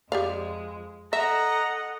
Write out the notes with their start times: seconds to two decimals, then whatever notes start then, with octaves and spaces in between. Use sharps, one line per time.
0.12 F2 G#3 G4 D5 F5
1.13 A4 D#5 E5 F#5 A#5